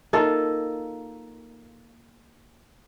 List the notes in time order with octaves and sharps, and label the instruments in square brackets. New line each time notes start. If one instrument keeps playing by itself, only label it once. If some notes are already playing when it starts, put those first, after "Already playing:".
[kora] A#3 D#4 F4 A4